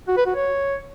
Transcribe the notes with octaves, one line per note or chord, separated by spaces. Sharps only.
F#4
B4
F#4
C#5